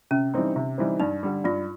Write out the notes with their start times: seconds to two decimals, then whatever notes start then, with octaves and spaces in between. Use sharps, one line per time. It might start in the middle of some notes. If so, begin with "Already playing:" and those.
0.11 C3 C#4
0.34 E3 G3 C4 D#4
0.56 C3
0.78 E3 G3 C4 D#4
1.00 G2 D#4
1.23 D3 G3
1.44 G2 F4